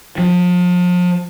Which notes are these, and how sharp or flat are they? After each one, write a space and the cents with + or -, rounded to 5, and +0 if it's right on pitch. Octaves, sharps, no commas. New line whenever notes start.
F3 +35